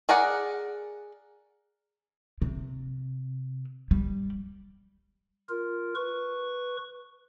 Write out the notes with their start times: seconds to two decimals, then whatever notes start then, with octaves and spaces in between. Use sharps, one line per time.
0.09 G#4 A#4 D5 F#5
2.42 C3
3.91 G3
5.49 F4 A#4
5.95 B4 C#6